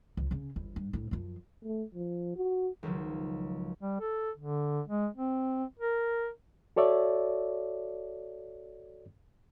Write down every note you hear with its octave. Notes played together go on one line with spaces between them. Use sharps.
C#2 F3
C#3 C#4
G1 E2
G2
D2 A2
F#2 F3
A3
F3
F#4
C#2 D#3 F3 F#3
G3
A4
D3
G#3
C4
A#4
F#4 A4 C#5 D5 E5